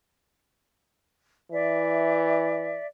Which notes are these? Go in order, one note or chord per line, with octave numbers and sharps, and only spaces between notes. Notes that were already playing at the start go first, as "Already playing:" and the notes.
E3 D5 E5